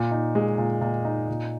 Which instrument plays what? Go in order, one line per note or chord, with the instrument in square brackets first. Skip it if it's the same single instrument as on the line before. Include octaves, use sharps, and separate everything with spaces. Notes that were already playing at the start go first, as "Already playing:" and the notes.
Already playing: [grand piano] A#2
D#4
G#3
A#2
A#2
D#4
A#2